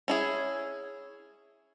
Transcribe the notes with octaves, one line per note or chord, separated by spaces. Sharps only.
C#4 E4 G#4